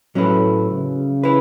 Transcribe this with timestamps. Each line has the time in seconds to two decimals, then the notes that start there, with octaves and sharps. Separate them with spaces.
0.15 A2 F#3 C#4 E4 B4
0.70 C#3
1.24 E4 B4